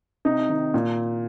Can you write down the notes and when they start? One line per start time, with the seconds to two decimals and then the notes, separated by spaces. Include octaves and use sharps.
0.25 C3 D#4
0.50 D#3
0.74 A#2